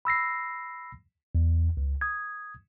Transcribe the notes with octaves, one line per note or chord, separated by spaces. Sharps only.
B5 E6 A#6 C7
E2
C#2
D#6 G#6